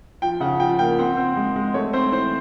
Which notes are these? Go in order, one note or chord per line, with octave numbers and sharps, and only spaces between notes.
F3 G5
C#3 F#5
F3 G5
A#3 G5
C4 F#5
C4
G#3
G#3
A3 C#5
C4 C5
E3 C5